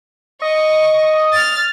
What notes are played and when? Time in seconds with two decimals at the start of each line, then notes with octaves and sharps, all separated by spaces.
0.42 D#5 C#6
1.33 F6 A6